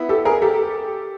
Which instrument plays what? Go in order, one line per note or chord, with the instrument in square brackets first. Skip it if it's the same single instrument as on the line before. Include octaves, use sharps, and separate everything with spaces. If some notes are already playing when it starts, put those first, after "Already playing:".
Already playing: [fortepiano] B3 E4
[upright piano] G4 A4
G#4 A#4
G4 A4